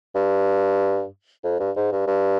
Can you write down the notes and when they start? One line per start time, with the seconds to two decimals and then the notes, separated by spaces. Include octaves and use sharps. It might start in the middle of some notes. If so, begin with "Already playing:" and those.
0.15 G2
1.44 F2
1.60 G2
1.76 G#2
1.92 G2
2.07 G2